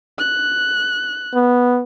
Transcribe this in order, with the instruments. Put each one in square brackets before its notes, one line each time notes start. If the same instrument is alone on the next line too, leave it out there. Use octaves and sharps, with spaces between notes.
[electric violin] F#6
[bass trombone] B3